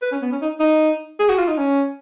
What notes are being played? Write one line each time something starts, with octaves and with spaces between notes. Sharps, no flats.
B4
C#4
B3
C#4
D#4
D#4
G#4
F#4
F4
D#4
C#4